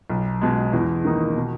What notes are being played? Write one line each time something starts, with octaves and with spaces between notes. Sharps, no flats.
B1
B2 G#3
E2
D#3 A#3 D#4 A#4
B2